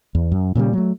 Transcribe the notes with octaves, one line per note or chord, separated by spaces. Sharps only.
E2
F#2
A#2 C#3 F#3 G3
F#3 A3